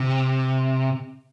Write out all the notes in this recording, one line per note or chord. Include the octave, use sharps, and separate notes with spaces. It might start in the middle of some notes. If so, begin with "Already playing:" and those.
Already playing: C3